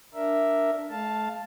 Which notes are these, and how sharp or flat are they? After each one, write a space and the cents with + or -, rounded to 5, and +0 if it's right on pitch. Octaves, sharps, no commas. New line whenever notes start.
D4 +0 A#4 +0 E5 +0
A3 -45 F5 +0 A5 +0